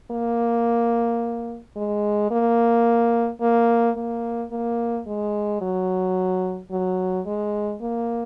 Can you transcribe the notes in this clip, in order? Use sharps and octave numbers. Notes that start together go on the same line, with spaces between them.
A#3
G#3
A#3
A#3
A#3
A#3
G#3
F#3
F#3
G#3
A#3